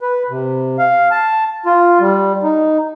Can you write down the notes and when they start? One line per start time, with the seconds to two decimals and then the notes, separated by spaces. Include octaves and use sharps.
0.01 B4
0.30 C3
0.79 F5
1.11 A5
1.66 F4
2.00 G3
2.43 D#4